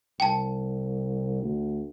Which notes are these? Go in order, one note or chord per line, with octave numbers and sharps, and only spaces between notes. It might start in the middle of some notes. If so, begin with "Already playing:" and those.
C2 G5 A5
D2